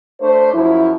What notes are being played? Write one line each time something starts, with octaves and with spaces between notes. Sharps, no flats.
A3 D4 C5
F#2 F3 E4